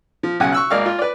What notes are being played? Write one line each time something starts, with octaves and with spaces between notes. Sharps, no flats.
F3
B1 C#3 F#5 G#5
C#6 E6 F#6
G#1 A#3 D5 D#5 F5 F6
F4
B4 D5